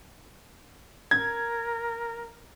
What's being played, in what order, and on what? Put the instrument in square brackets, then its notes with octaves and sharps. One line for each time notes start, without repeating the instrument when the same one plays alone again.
[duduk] A#4 [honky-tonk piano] G#6